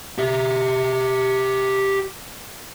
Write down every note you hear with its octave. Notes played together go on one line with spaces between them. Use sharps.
G4 E5